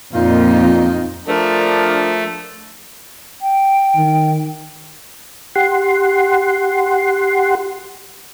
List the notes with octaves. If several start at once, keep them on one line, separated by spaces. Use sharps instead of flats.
F2 A#2 D#4 F4
F3 A3 D4 A#4
G5
D#3
G4 F#5 C6